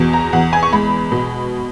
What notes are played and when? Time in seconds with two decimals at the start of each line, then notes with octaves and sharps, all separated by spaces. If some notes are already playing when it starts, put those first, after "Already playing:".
Already playing: E2 B2
0.13 A#5
0.33 E2 F#5
0.53 G#5
0.63 C#6
0.73 G#3 B5
1.12 B2